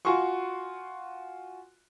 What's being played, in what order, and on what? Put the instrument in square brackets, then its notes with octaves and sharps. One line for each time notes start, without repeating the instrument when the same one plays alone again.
[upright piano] F4 F#4 G#5 C6 C#6